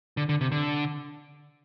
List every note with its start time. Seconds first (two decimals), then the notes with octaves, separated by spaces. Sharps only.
0.17 D3
0.29 D3
0.41 C3
0.52 D3